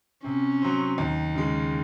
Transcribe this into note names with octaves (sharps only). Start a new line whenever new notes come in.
C3 C#4
F#3 C4
D#2
C#3 G#3